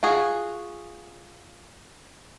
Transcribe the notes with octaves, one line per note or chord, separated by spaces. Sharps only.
F4 F#4 G#4